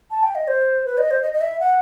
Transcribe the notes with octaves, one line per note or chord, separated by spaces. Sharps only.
A5
G5
D#5
C5
B4
D#5
C5
D#5
D#5
E5
F#5